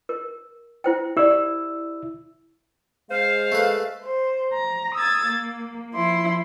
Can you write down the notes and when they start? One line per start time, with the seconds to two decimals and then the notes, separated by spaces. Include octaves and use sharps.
0.09 A#4
0.84 E4 C5 G5
1.17 E4 G4 D5 E6
3.11 G#3 C5 F5
3.52 A3 B4
4.04 C5
4.54 A#5
4.95 D#6 E6 G#6 A6
5.26 A#3
5.93 F3 E4 C6